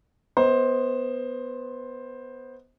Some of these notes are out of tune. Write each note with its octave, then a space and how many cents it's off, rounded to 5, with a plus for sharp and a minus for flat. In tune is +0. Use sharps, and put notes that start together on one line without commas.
B3 +0 C5 +10 D#5 +35